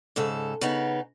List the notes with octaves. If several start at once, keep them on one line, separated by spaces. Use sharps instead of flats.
G#2 C#3 A4
C#3 B3 D#4